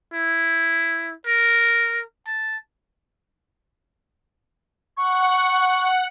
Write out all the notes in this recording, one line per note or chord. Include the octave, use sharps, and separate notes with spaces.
E4
A#4
A5
F#5 C#6